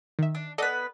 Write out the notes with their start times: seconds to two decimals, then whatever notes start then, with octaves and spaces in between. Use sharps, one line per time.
0.19 D#3 E5
0.35 D4
0.58 B3 A4 B4 D5 D#5